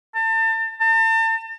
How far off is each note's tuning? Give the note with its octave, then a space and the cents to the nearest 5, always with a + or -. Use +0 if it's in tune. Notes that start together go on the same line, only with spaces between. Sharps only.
A5 +35
A5 +40